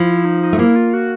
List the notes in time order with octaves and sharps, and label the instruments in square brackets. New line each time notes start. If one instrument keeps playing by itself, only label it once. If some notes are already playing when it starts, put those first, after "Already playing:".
Already playing: [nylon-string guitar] F3 [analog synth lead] E4
[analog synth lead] D#4
D#4
[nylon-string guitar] A3
[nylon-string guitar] A#3 [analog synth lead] E4
[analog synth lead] F4
F#4